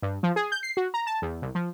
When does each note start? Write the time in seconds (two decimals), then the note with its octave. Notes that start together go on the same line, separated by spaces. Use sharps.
0.02 G2
0.23 F3
0.36 G#4
0.52 G6
0.63 C7
0.77 F#4
0.94 A#5
1.07 A5
1.22 E2
1.42 C2
1.55 F3